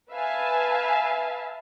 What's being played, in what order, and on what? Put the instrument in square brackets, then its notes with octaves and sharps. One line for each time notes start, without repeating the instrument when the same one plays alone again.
[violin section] B4 E5 F5 G#5 A5